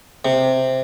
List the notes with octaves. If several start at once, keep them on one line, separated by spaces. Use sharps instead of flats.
C3